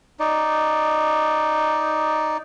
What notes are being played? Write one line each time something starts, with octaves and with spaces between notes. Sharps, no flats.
D#4 D5